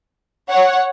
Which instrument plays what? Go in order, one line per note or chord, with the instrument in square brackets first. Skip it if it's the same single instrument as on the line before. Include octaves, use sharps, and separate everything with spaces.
[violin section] C#5 F#5